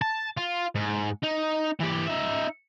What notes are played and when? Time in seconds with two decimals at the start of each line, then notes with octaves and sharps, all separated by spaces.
0.02 A5
0.37 F4
0.75 G#2
1.23 D#4
1.80 E3 G4
2.07 D#4 E5